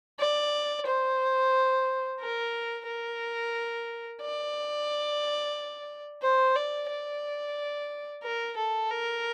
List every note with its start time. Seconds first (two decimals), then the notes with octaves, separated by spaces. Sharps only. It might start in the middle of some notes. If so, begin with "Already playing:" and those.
0.19 D5
0.86 C5
2.20 A#4
2.87 A#4
4.21 D5
6.22 C5
6.55 D5
6.89 D5
8.23 A#4
8.57 A4
8.91 A#4